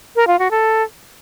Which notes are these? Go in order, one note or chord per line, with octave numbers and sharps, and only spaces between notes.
A#4
F4
F#4
A4